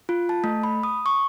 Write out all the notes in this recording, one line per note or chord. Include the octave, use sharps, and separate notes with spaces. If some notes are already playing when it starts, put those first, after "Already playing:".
F4
A5
A3
B5
D#6
C#6